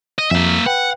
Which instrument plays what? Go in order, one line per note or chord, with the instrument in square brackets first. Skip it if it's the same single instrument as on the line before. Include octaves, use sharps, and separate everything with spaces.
[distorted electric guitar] D#5
[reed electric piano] F2 [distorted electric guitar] A#3 E5
[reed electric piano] B4 G5 [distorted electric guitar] F#5